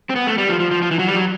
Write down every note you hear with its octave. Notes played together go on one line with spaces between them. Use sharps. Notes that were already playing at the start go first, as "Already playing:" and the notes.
C4
B3
A3
G3
F3
F3
F3
F3
E3
F#3
G3
F#3